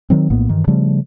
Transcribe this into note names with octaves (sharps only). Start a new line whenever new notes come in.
D#3 F#3 C4
A#1 A2 A#3 B3
G2 D#3 E3
C#3 F3 G3 A3